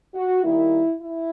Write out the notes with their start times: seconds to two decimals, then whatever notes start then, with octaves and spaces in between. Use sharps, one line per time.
0.14 F#4
0.43 D#3 G3 A#3 E4
0.99 E4